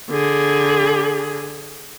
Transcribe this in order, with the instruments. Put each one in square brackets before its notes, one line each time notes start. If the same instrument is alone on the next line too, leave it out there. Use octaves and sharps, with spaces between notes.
[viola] D3 G#4